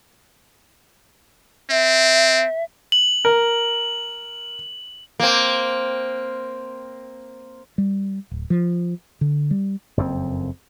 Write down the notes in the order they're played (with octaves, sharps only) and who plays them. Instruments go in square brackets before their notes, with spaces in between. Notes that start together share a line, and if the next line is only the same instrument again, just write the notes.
[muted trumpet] C4 [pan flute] E5
[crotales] F#7
[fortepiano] A#4
[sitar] A#3 C4
[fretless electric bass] G3
D1
F3
D3
G3
[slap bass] F#1 F2 C#3 C4